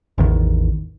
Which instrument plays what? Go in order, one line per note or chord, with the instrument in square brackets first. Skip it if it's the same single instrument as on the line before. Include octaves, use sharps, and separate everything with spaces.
[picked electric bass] A1 E2 D#3